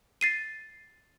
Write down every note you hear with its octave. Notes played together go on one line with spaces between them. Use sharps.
A6 C7 D#7